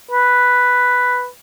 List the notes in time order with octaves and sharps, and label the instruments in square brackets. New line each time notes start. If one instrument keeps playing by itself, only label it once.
[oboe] B4